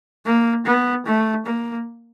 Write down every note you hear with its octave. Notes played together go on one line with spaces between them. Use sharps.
A#3
B3
A3
A#3